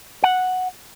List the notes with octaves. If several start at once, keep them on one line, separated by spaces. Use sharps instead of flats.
F#5